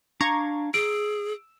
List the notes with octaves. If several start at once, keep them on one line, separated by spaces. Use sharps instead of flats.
D4 F5 A#5 C#6 D6 G#6
G#4 E6 D7